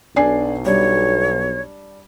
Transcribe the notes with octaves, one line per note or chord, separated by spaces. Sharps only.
B1 D4 G#5 C7
G3 D4 C#5